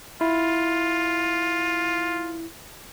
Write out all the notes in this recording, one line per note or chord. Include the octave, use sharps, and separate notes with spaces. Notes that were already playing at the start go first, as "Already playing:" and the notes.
E4 F4